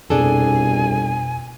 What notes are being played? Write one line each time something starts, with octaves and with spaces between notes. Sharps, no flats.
G1 C2 F2 B2 D4 G#4 A4 G#5